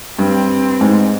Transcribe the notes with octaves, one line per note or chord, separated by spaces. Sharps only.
G2 C4
G#2